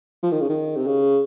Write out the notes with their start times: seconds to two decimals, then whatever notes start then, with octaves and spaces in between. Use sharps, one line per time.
0.23 F3
0.32 D#3
0.41 C#3
0.49 D#3
0.77 C3
0.87 C#3